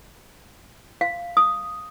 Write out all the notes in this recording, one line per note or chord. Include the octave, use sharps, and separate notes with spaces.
F5
D#6